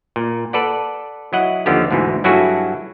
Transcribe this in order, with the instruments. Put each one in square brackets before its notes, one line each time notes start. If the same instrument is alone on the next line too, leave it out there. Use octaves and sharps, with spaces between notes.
[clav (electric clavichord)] A#2
A4 B4 D5 F#5
F#3 E4 D#5 F#5
D#2 D3 F3 B3 G4
D2 G#2 B2 E3
G2 F#3 E4 F#4 G#4 A4